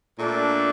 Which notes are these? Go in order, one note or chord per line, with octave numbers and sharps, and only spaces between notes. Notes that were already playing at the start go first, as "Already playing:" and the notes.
A#2 A3 D4